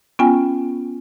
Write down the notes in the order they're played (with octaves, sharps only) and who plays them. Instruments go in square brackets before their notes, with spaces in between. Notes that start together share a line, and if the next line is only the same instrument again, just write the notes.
[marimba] B3 C#4 F4 G5 G#5